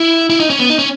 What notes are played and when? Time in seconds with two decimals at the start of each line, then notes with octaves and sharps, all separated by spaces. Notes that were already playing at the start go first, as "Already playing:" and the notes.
Already playing: E4
0.30 E4
0.40 D#4
0.50 C#4
0.60 B3
0.70 D#4
0.79 C#4